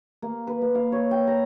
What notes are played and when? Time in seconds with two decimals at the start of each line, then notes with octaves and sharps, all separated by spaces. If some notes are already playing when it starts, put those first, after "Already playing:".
0.22 A#3
0.47 B4
0.61 A#3
0.75 F5
0.92 C#5
1.11 G5
1.27 A#5